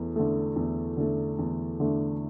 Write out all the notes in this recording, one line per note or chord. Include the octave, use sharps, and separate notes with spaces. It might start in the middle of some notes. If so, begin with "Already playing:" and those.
Already playing: E2 A3
D3 A3
E2
D3 A3
E2
D3 A3